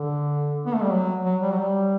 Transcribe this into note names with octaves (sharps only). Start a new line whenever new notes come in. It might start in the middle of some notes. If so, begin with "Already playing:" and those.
Already playing: D3
B3
A3
G3
F#3
F#3
G3
F#3
G3